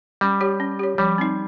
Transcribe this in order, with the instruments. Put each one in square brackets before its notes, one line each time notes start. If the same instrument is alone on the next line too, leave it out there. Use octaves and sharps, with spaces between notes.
[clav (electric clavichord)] G3 [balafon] C#4
[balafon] G4 C#5
C#4
G4 C#5
[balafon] F3 [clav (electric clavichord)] G3
[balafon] C4 D#4